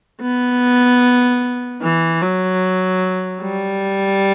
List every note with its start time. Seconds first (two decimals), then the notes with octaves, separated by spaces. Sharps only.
0.22 B3
1.82 E3
2.22 F#3
3.42 G3